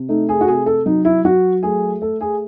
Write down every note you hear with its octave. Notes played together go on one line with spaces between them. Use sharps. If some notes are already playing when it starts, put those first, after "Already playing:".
Already playing: C3
A3 D#4
G#4
F#4
C3 G#4
A4
F#3 D#4
E4
F#3 F#4
A3 G#4
A3 A4
G#4